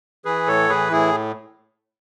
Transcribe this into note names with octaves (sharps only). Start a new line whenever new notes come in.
E3 G#4 B4
A2 A4 C#5
E3 G#4 B4
A2 E4 G#4